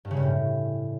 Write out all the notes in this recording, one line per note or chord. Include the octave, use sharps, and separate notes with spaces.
G2
C#3
G2
A2